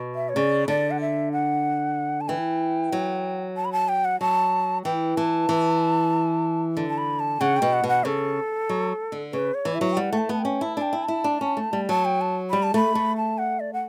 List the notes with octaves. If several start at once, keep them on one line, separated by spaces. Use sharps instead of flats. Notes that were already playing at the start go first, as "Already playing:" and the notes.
Already playing: B2
E5
C#5
C#3 D5
D3 D5
F#5
E5
F#5
A5
E3 G5
F#3
A5
B5
A5
G5
F#5
F#3 A5
E3 G5
E3 A5
E3
D3
A5
B5
A5
C#3 F#5
G5
B2
F#5
B2 F#5
C#3 A4
F#3
D3
C#3 B4
C#5
E3
E5
F#3
G5
G3 F#5
A3
A5
B3 A5
G5
C#4
E4 A5
D4 A5
G5
E4
E4 A5
D4
C#4
A3
G3
F#3 A5
G5
A5
G3 B5
A5
A3 B5
A3
A5
F#5
D5
F#5